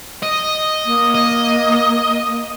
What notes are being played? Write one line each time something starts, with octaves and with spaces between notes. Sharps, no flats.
D#5
A#3
D#5